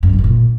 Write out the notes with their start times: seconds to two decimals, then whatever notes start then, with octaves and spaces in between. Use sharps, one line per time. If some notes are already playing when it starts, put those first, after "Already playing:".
0.03 F#2
0.08 C3
0.13 D3
0.19 B2
0.24 A#2